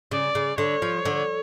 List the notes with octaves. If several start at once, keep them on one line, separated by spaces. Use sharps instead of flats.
C#3 D5
C#3
D3 C#5
F3
D3